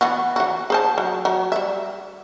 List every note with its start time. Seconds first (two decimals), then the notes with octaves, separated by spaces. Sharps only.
0.01 E3 B3 F#4
0.36 E3 F#4
0.70 G#4 C5 A5
0.98 F#3
1.25 F#3
1.52 G3 E5